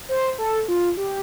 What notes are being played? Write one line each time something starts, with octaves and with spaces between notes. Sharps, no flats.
C5
A4
F4
G4